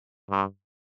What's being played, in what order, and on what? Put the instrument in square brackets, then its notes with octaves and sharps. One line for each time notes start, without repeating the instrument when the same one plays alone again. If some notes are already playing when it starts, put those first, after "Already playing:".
[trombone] G2